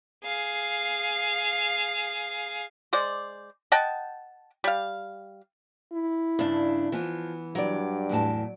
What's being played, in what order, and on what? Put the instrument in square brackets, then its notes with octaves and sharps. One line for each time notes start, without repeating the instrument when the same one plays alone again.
[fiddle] G#4 F5
[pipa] G#3 C5 D5
D#5 F#5 G5 A5
G3 F5
[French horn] E4
[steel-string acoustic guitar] G2 D4 [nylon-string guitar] C#3
[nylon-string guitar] E3 B3 [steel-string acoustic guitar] F3
[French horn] G2 [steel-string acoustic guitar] F#3 D5
[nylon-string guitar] E2 A2 A5